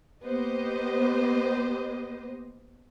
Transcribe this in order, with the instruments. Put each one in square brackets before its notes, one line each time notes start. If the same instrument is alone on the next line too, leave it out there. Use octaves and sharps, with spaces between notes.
[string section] A#3 B3 G4 C5 D#5